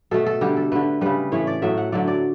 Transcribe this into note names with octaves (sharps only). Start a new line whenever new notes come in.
B2 A3 A4
A4
D3 G3 G4
A4
D3 A3 B4
C#3 G3 B4
A2 E3 A3 C#5
D5
A2 F#3 A3 E5
F#5
D3 F#3 A3 D5
D5